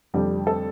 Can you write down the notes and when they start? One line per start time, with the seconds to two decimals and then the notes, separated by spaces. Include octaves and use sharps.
0.14 F1 F2 D3 G3 G4
0.47 A4